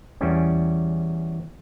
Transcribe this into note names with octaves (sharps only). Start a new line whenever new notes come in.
E2 G3 C#4